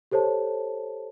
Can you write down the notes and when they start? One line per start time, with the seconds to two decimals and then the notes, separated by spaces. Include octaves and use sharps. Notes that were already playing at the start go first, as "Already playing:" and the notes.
0.11 G4 A4 C5 C#5 A5